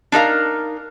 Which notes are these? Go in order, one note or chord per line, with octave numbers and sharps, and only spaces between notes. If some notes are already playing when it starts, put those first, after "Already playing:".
D4 D#4 A#4 F5